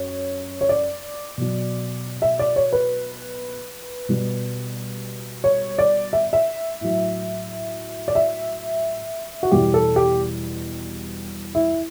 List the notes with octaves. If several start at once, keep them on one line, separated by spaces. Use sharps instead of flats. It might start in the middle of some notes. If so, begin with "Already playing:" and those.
Already playing: F#2 C#5
C#5
D5
B2 F#3
E5
D5
C#5
B4
B2 G3
C#5
D5
E5
E5
A2 F#3
D5
E5
F#4
E2 B2 G3 G4
A4
G4
E4